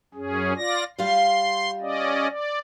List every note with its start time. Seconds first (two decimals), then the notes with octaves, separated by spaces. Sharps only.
0.14 F#2 C#4 G#4
0.57 F4 D5 A#6
0.98 G3 F4 F5 C6
1.81 C#4 D5 D#5
2.29 D5